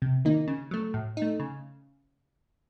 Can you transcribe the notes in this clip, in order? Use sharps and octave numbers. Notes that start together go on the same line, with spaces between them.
C3
D#3 A#3 D#4
C#3
F#3 A3
A2
A3 D#4
C#3